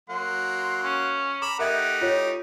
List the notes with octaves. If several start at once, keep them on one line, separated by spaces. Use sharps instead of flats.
F#3 A#3 F#5 C6
C#4
A#5 B5 D6 E7
A3 D#4 G4 A#4 E5 F#5 G#6
F4 C#5